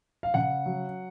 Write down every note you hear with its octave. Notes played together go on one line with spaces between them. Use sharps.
F5
C#3 F#5
F#3